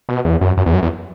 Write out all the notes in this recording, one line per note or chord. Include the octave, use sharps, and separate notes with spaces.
B2
E2
F#2
F#2
E2
F#2
E2